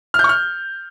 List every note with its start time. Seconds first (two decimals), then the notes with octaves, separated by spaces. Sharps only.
0.14 F6
0.19 G6
0.24 C#6
0.29 F6